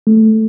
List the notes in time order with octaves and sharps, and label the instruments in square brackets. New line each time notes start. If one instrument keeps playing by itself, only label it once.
[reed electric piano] A3